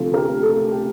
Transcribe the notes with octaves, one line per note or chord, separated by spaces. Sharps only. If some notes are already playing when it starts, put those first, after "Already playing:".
Already playing: D2 C3 F3 A3 A4
G4 A#4
A4
G4